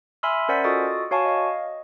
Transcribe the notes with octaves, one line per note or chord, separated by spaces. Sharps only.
E5 G#5 B5 C6 E6 F6
C#4 A#4 C5 D5 F#5 B6
F4 F#4 A4 D#5 D#6 A6
F#4 C#5 F5 G#5 A5 C#6
D#5 F5
D#5